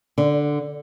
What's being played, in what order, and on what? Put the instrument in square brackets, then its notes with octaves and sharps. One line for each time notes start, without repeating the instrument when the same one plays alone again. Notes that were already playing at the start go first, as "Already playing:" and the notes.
[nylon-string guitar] D3